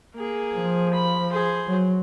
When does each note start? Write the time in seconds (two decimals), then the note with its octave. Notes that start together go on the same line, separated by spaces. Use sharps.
0.15 A#3 G#4
0.56 F3
0.94 B5
1.32 G#4 C5
1.67 F#3